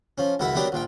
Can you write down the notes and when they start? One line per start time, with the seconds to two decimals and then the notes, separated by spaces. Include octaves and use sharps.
0.18 F3 C#4
0.39 C#2 F#2 E4 F#4 E5
0.55 F#3 B3 D4 G4 A#4
0.72 A#1 F3 G5